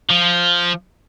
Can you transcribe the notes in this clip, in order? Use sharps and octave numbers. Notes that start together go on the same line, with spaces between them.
F3